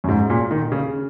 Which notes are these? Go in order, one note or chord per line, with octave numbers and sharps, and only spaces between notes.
F#2
G#2
A#2
D#3
C#3